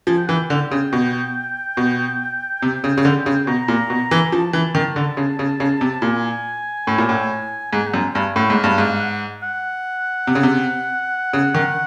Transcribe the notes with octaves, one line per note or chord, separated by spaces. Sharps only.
F3 G#5
G5
E3 F#5
G5
D3
C#3
B2
B2
C3
C#3
C#3
D3
C#3
B2 A#5
A#2
B2
E3
F3 A5
E3
D#3
D3
C#3
C#3
C#3
C3
A#2 G#5
A2
A#2
A2
G#2 G#5
F#5
F#2 G5
G2 G#5
A2 F#5
G#2
F5
G2
G#2 F5
F#5
F#5
C3
C#3
C3
C#3
D#3